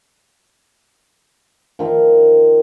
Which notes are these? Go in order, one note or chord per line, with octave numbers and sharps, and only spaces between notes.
D#3 F3